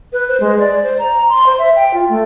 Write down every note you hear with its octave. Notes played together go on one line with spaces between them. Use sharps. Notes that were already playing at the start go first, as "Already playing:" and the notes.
B4
C5
G#3
D5
C5
A#5
C6
C5
E5
G5
F4
A3